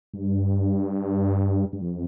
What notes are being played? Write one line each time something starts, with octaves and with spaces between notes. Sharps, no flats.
G2
G2
F2